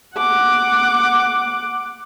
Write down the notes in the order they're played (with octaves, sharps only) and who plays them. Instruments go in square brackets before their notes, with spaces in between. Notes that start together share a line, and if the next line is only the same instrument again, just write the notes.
[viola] F#5 D6